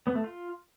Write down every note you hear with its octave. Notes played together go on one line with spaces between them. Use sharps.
B3
A3
F4